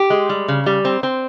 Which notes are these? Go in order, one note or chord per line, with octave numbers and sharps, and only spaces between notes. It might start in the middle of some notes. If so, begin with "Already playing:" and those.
Already playing: G4
G#3
G3
C#3
G3
C4
C4